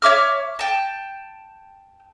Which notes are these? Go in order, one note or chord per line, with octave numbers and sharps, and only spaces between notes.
C#5 E5 D6 F6
G5 A5